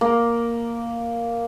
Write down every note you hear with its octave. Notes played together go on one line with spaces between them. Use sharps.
A#3